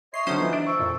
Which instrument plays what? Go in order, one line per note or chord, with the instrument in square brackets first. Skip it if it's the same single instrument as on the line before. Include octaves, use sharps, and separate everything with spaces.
[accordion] C#5 D#5 C6 [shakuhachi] E5 [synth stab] C7
[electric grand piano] D3 F#3 [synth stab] C#4 C5 D#6 [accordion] D#4
[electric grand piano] E3 F3 B3
[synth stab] D4 [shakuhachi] E5 [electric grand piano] D7
[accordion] A4 [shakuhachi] C5 [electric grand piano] C#6
[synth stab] F2 A#2